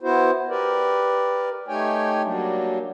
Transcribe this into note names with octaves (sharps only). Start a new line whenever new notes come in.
B3 E4 F#4 C5
G4 A#4 B4 D5
A3 D#4 G4 C#5 G5 G#5
F#3 G3 A#3 D4